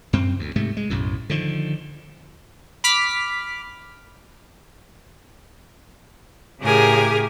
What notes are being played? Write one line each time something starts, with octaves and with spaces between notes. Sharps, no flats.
F#2 C4
D2
G#2 C3 A3
G#3
B1 F#2 A2
D3 D#3 F3
B5 D6 F6 B6
A2 C#3 G4 G#4 A#4 G#5